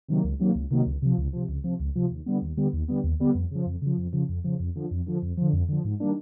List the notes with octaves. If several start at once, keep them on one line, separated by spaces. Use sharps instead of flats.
C3 D#3 F#3 A#3
C#2
C3 D#3 F#3 A#3
C#2
C3 D#3 F#3 A#3
C#2
C3 F3
C#2
C3 F3
C#2
C3 F3
C#2
C3 F3
D#2
D3 G3 B3
D#2
D3 G3 B3
D#2
D3 G3 B3
D#2
D3 G3 B3
F2
C#3 F3
F2
C#3 F3
F2
C#3 F3
F2
C#3 F3
F2
D3 F3
F2
D3 F3
F2
D3 F3
F2
D3 F3
G#2
D#3 G3 A#3 D4